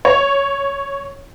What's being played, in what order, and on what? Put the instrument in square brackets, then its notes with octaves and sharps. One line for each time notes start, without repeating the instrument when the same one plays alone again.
[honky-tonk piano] C#5